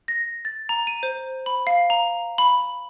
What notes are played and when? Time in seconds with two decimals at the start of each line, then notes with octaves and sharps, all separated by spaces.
0.08 A#6
0.45 A6
0.69 A#5
0.87 D#7
1.03 C5
1.46 B5
1.67 F5
1.90 A#5
2.38 B5